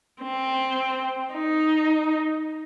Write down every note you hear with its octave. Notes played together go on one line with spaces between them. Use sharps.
C4
D#4